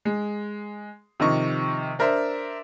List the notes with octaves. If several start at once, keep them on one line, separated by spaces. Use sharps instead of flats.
G#3
C3 D#3 F3 D#5 C#6
D4 A#4 C5 E5